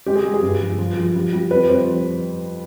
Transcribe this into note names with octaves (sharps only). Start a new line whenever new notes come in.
G#3 G4
G#4
G#3
G#4
G2
F3
F3
F3
G3
G3
F2 B4
F2 C5